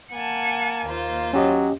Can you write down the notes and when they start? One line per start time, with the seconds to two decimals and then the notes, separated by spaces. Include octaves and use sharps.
0.12 A#3 F#5 G#5 A5
0.85 D#2 F4 C5
1.33 F#3 C#4 G4 D#5